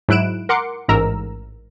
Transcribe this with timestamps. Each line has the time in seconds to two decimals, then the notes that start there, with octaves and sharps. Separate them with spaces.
0.09 G#2 F#3 E4 F#6 D7 E7
0.49 A#4 F#5 C6 D6 C#7
0.89 A1 G#2 A#4 A#5 E6